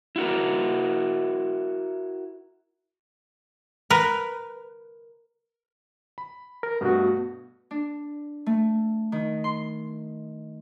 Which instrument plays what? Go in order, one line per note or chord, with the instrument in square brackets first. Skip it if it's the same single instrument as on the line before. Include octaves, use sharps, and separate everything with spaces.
[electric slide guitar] E4 F#4 A#4
[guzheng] A#4 B4
[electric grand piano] B5
[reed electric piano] A#4
[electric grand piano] G2 B2 A3 [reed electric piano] B3 F#4
[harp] D4
A3
D#3
C6